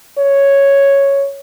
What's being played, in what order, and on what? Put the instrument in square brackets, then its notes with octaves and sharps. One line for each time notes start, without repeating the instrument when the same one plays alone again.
[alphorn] C#5